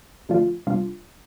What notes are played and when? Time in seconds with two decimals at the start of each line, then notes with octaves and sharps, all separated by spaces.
0.29 D3 F3 A3 D4 F4
0.67 C3 G3 D4 F4